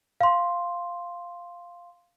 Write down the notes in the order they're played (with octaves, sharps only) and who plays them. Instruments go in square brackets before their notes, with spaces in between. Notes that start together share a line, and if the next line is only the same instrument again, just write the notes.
[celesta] F5 C6